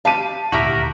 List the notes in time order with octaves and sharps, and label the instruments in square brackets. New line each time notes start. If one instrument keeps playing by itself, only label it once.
[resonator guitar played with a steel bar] G4 F5 [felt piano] A5 D#7
[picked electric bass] D#1 G#1 D2 [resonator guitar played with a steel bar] E4 G4 E5 [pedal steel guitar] F#4 A#4